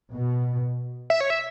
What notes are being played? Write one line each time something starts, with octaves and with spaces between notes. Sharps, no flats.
B2
E5
C#5
E5